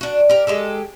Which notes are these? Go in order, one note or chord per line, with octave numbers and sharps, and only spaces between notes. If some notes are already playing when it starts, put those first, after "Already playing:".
D4 F#4
G4 A#4
G#3 G4 A4